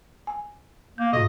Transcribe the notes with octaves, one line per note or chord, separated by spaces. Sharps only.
G#5
A#3 G6
G#2 B2 D#5